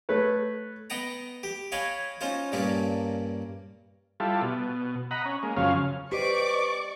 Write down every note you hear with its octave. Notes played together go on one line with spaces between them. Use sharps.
A3 B4 C#5
B3 D#5 F#5 G5 A#5
G4
C#5 D#5 F5 G5 G#5 B5
C#4 D#4 F4 C5
G2 A#2 A#3 C#4 D4
G3 E4 F4 A4
B2
D#5 F#5 A#5 B5
C#4
G#3 A#3
F#2 C#3 F3 C#4 F5
G4 B4 C5 D5 D#5 C#6 D6